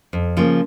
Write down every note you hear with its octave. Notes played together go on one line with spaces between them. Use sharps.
F2
C#3 F3 A#3